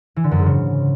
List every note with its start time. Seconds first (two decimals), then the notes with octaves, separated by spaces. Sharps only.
0.16 E3
0.24 D3
0.31 F#2
0.39 G#2
0.46 C#3